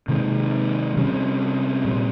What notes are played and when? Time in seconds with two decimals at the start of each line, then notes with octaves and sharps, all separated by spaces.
0.08 C3 D#3 G#3
0.97 C3 G3 C#4
1.85 A#2 G3 C4